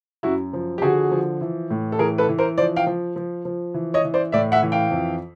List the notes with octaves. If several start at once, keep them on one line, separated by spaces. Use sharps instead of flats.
F#2 E4 F#4
F3
G4
D3 F#4 G#4
F3
E3
A2
A4
E3 G#4 A#4
A4 B4
E3
A#4 C5
F3 C5 D5
F5 G5
F3
F3
F3
E3
C#5 D#5
E3
C5 D5
A2 D5 E5
E5 F#5
E3
F5 G5
F2